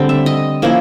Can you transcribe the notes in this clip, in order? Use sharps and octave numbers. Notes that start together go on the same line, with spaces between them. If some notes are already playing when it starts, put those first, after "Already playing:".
Already playing: D3 G3 A3 C4
E5
D#5
F3 A#3 C#4 E4